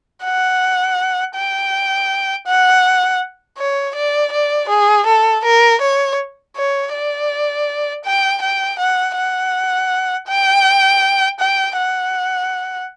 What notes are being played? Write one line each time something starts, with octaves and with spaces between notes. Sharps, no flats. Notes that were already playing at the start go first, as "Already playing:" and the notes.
F#5
G5
F#5
C#5
D5
D5
G#4
A4
A#4
C#5
C#5
D5
G5
G5
F#5
F#5
G5
G5
F#5